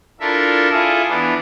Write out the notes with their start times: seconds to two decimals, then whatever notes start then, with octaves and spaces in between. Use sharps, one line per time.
0.20 D4 E4 F4 A4 A#4 E5
0.72 E4 F4 G#4 A4
1.08 E3 B3 D4